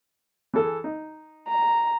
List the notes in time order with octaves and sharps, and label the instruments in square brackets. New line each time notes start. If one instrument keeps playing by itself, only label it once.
[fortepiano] E3 G#4 A4
D#4
[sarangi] A#5